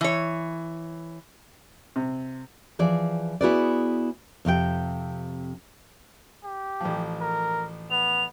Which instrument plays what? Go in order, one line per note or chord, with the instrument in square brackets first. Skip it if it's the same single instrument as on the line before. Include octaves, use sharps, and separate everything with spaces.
[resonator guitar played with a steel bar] E3 C#5
[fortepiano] C3
[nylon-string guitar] E3 F3 G#4 D5
B3 E4 F#4 G#4 B4 D5
F2 C3 F4 G5
[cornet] G4
[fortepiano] A1 F3
[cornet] A#4
[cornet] B3 [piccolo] F7